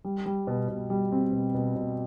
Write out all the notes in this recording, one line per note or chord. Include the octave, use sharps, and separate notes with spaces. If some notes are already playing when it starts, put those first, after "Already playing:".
G3
G3
B2
B2
G3
C4
B2
B2
B2